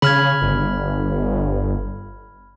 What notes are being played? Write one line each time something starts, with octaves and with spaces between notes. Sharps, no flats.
C#3 B5 F6 G#6
G1